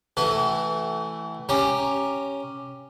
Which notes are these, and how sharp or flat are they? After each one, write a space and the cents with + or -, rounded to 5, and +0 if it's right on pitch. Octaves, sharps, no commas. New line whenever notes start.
E3 +0 A3 +0 F#4 +45
C#4 +0 G4 +5 A#5 +0